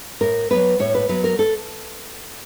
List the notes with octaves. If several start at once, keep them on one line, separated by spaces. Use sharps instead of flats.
A2 A#4
F#3 B3 B4
A2 C#5
B4
F#3 B3 B4
A#4
A4